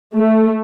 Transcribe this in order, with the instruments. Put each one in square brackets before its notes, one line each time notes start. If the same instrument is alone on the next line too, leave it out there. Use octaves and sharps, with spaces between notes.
[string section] A3